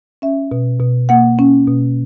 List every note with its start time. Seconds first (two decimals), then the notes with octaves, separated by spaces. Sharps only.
0.22 C#4 E5
0.51 B2
0.80 B2
1.09 A#3 F#5
1.39 C#4
1.67 B2